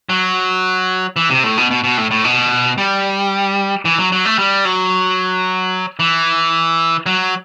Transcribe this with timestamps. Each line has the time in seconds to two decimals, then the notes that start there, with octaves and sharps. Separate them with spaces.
0.09 F#3
1.16 E3
1.30 C3
1.44 A2
1.58 B2
1.71 B2
1.84 B2
1.98 A2
2.11 A2
2.24 B2
2.78 G3
3.85 E3
3.99 F#3
4.12 F#3
4.25 A3
4.39 G3
4.65 F#3
5.99 E3
7.06 F#3